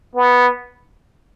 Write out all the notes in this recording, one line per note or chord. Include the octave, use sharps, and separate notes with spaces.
B3